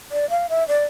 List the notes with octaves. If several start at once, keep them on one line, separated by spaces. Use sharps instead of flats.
D5
F5
E5
D5